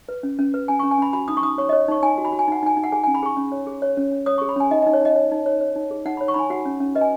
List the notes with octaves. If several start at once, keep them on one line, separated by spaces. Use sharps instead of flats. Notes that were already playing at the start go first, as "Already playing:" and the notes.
B4
C#4
C#4
B4
C#4 G#5
C#6
C#4
G#5
C#4 B5
F#4 B5
D#4 D#6
C#6
D#4 D#6
C#5 C#6
D#5
C#5
D#4 C#6
D#4 G#5
F#4
B5
F#4
G#5
D#4 F#5
D#4 G#5
D#4
F#5
G#4 G#5
G#5
C#4
B5
G#4 C#6
C#4
C#5
G#4
C#5
C#4
C#4
C#5 D#6
C#6
G#4
B5
C#4 G#5
D#4 D#5
D#5
D#4
C#5
D#4 D#5
C#5
D#4
C#5
C#5
D#4
G#4
D#4 F#5
B5
C#5
C#6
D#4 G#5 B5
F#4 F#5
C#4
C#4
B4 D#5
G#5